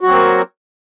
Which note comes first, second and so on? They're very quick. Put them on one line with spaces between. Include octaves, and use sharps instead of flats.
F#4 F#3 C4 A#3